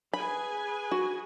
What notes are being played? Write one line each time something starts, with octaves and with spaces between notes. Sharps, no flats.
G#4 B4 G#5 B5
F#4